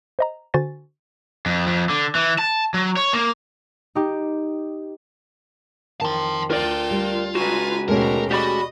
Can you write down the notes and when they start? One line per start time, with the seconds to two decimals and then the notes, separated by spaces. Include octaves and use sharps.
0.19 C5 D#5 A#5
0.54 D3 F#4 C5 G#5 A6
1.46 F2
1.67 F2
1.89 D3
2.15 E3
2.38 A5
2.74 F#3
2.97 C#5
3.13 A#3
3.95 D#4 G4
6.01 F2 D#3 A5 C6
6.50 D2 F4 A4 A#4 D5 G5
6.91 G3
7.35 C#2 F#4 B4 G#5 A#5
7.88 D#2 B2 G#3 A3 C#4 G4 A#4
8.31 F#4 G4 D5 D#5 B5